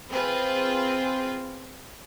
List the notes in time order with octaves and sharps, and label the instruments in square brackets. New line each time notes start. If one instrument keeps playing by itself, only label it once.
[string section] C4 F4 G#4 B4